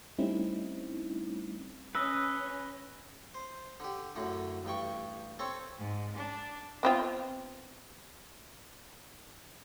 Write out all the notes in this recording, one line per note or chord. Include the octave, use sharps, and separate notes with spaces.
G3 A3 C4 C#4 D#4 E4
C#4 B4 D#5 E6
C5
D3 G4
F#2 A2 D3
A1 G2 G5 C#6
C4 A4 C#5
G#2
D4
B3 C4 F4